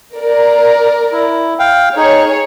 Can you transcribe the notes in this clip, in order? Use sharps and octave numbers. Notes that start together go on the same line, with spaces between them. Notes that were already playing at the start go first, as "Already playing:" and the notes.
A#4 D5
E4
F5 G5
D#4 G#4 C#5